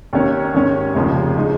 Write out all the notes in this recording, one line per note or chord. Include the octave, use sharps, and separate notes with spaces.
D#2 D#3 C#4
G#2 D#3 C#4
F1 D#2 C#3 F3 G#3
G#3 D#4